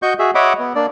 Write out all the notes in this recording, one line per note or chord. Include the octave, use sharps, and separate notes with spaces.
F#4 D#5 C#6 G6
F#4 G#4 E5
C#5 D#5 E5 F#5 B5 D6
B3
A#3 D4 D5